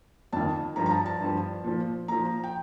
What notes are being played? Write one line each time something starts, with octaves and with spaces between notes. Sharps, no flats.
F2 D#3 A5
G2 F3 A#5
A#5
A5
A5
G2 F3
A#2 F3
A#2 F3 A#5
G5